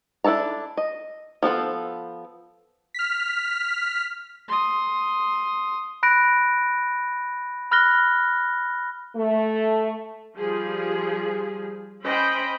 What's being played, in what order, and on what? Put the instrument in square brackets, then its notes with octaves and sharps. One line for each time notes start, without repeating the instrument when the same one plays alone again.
[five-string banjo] D4 E4 A4 A5 A#5
D#5
F3 B3 A4 C5
[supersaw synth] F6 B6
[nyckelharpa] C6 D#6
[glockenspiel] B5 F#6 A#6 D7
B5 F6 F#6 A#6 G7
[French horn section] A3
[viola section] F3 G3 G#4
C#4 C5 D#5 G5 B5